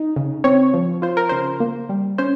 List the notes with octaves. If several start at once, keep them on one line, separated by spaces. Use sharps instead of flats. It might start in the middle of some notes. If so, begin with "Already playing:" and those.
Already playing: D#4
C#3
C4 C#5
F3
F4 C5
A#4
C#3 C5
A#3
G3
C#4 C5